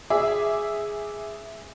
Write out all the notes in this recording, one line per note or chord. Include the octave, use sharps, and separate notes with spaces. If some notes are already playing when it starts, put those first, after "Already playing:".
G#4 E5 D6